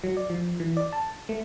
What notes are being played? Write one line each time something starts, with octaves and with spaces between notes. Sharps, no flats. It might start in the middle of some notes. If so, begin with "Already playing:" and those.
F#3
D5
F3
E3
D5
A5
A3